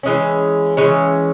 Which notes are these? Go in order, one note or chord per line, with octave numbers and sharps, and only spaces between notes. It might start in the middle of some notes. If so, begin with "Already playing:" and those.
E3 G#3 C#4
E3 G#3 C#4